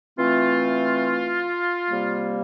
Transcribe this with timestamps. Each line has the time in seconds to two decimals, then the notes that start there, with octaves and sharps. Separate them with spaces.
0.18 E3 A3 C4 F4
1.90 C3 G3 A#3